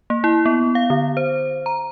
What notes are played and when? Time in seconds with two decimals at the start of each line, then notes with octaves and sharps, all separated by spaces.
0.10 A#3
0.24 E4
0.46 B3
0.75 F5
0.90 D3
1.17 C5
1.66 A#5